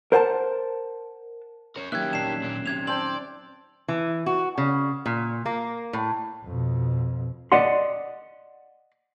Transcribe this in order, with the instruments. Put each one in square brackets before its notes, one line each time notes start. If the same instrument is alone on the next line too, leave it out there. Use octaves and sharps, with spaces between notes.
[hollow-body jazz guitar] A#4 C5 F#5 G5 A5
[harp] C#4 [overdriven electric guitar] A#4 C#5
[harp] F#3 C#4 D#4 [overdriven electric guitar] A#3 G4 [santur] E5 [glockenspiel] F#6 G#6
[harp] D#1 [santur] D4 [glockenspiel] C7 E7
[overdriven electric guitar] A#2 A#3
[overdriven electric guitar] D#2 C3 [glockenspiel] G#6 F7
[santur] C4 G5 A5 [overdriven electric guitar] D5 [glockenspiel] F#7
[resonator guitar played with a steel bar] E3
F#4
C#3
A#2
A#3
A2
[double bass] F2 B2
[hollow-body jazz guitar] D5 D#5 F#5 C6